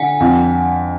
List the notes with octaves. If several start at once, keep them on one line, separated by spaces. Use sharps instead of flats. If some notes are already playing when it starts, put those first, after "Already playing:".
Already playing: D3 F#5 G#5
F2